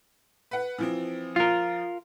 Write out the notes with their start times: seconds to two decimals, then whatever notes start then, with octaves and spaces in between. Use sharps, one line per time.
0.51 B4 F#5
0.78 E3 F3 C4
1.36 F3 F4 A#4